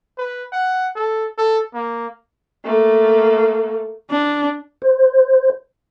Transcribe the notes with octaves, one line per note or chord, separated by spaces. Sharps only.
B4
F#5
A4
A4
A#3
A3 A#3
D4
C5